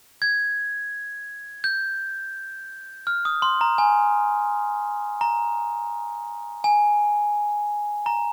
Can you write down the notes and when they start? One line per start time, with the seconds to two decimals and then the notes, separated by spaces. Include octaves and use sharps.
0.22 G#6
1.64 G6
3.07 F6
3.25 D#6
3.42 C6
3.61 A#5
3.78 G#5
5.21 A#5
6.64 G#5
8.06 A#5